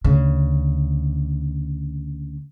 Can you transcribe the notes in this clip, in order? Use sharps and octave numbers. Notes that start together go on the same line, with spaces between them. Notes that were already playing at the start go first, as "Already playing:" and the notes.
D2 C#3